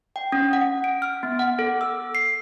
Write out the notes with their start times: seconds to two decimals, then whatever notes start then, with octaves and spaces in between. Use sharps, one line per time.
0.16 G5
0.32 C#4
0.53 F#5
0.84 D7
1.02 F6
1.23 B3
1.39 F#5
1.59 A4
1.81 E6
2.15 C7